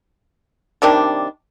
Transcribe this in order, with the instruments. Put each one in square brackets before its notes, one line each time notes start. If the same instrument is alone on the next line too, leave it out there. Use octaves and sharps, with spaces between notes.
[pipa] C3 D#3 G3 D4